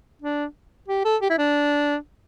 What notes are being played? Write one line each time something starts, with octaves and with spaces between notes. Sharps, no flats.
D4
G4
A4
G4
E4
D4